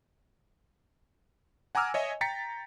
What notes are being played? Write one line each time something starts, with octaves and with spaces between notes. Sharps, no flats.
F#5 G#5 A#5 D6 E6 F6
C#5 D#5 E5 G#5
G5 A#5 A6 B6 C#7